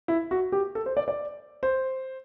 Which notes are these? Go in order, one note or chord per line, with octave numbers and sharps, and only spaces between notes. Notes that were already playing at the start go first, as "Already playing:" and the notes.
E4
F#4
G4
A4
C5
D5
D5
C5